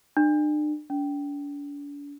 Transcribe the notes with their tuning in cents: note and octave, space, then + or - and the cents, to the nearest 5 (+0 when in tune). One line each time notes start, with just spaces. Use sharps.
D4 +40
D4 -40